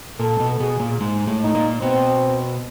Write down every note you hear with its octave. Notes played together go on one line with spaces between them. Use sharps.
A#2 A#3 A4
B2 B3
B2 B3 G#4
A#2 A#3
G#2 G#3
A2 A3
D#4
A3
A#2 A#3
B2 B3 C4